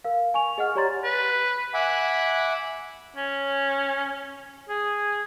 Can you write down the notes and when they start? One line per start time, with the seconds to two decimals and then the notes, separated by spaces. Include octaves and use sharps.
0.04 A#4 F5
0.34 G#5 C#6 F7
0.58 G#4 D#5 F#5 F6
0.75 G4 C#5 D5 A#5 C6 A6
1.04 B4
1.74 E5 F#5 G#5 B5 D6
3.16 C#4
4.69 G#4